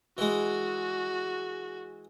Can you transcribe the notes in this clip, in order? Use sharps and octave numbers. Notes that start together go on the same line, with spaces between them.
E3 G#3 F#4